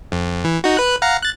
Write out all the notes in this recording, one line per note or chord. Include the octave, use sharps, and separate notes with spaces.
F2
E3
D#4 F#4
B4 F#6
F5 F#5 A#5
F#6 A6